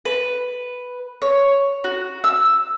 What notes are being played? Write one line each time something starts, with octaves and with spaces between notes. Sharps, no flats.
B4
C#5
F#4
E6